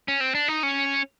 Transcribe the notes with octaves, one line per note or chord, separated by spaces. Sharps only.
C#4
C4
D4
D#4
C#4